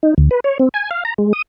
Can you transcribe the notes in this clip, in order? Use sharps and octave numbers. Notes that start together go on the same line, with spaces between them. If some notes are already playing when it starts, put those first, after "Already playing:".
D#4
D2
B4
C#5
C4
G#5
F5
A#5
G#3
D#6